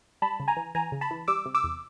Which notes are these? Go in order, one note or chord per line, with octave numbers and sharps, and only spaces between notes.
G3 A5 B5
C#3
G#5 A#5
E3
E3 G#5 A#5
C#3
A5 B5
E3
G3 D6 E6
C3
D6 E6
E2